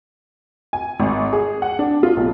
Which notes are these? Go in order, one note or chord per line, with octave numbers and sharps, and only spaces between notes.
G#5
G#1
G#4
F#5
D4
F4
B1